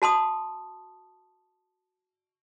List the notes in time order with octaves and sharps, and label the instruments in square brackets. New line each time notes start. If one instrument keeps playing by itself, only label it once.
[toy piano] F#4 A5 C6 D#6